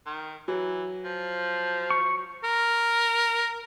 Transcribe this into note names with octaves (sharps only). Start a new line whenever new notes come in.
D#3
E3 F#3
F3
C#6
A#4